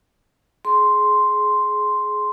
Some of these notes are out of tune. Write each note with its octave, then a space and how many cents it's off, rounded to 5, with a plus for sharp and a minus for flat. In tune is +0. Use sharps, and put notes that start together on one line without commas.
G#4 +20 C6 +0